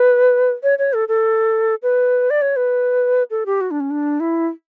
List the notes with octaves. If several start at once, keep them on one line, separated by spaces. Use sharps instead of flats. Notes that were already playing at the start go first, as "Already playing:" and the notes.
Already playing: B4
C#5
C#5
A4
A4
B4
D5
C#5
B4
A4
G4
F#4
D4
C#4
D4
E4